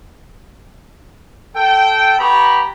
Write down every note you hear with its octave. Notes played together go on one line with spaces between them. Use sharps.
A4 G5
B3 G4 A#5 B5 C#6